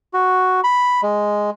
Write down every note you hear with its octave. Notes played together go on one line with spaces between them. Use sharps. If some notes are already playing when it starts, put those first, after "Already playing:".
F#4
B5
G#3